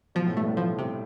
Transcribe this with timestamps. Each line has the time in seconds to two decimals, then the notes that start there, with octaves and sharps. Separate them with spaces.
0.15 B2 F3
0.26 A2
0.37 G2 A3
0.48 A2
0.57 F3
0.79 C3